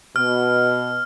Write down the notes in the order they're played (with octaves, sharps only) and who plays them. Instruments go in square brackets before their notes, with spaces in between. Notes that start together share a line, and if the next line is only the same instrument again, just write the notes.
[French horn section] B2 [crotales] F6